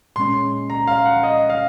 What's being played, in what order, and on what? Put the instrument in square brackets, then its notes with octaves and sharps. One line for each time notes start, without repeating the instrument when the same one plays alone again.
[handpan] A#2 G#3 C#4 [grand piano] C6
[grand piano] A#5
F5
F#5
D#5
F5